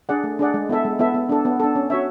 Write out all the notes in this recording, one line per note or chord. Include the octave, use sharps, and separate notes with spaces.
D4 G#4 D5 F#5
A3
D4 G#4 D5 F#5
G#3
B3 E4 A4 E5
G#3
B3 E4 A4 E5
B3
D4 A4
B3
D4 A4
C#4
F#4 C#5 E5